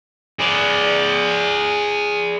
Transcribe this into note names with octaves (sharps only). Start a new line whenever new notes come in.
G#4 D5